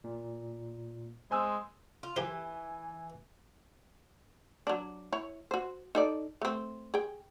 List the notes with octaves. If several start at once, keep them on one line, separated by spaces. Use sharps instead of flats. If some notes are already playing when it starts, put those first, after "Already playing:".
A#2
G#3 C5 G#5 E6
F4
E3 G4 A#4 C5 G#5
F#3 D4
E4 C#5
F#4 C5
D#4 A4 D5
A3 C4
G#4 G5